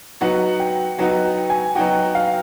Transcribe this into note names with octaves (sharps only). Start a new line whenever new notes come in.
F#3 B3 D#4 F#4 F#5
G5
F#3 B3 D#4 F#4 F#5
G5
G#5
F#3 B3 D#4 F#4 G5
F5